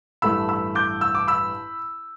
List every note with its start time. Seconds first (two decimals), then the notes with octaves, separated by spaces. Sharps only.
0.22 A1 G2 E3 A3 B5 E6
0.49 B5 E6
0.75 D6 G6
1.01 E6
1.15 D6
1.28 B5 E6